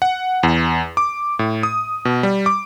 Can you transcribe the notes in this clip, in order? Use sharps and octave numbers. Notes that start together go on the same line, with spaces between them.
F#5
E2
D6
A2
D#6
B2
G3
D6